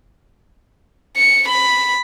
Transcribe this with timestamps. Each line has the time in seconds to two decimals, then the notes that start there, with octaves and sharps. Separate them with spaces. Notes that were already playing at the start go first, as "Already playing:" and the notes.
1.17 C#7
1.48 B5